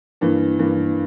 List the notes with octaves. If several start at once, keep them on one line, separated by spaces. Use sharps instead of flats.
G2 E3 A#3
G2 E3 A#3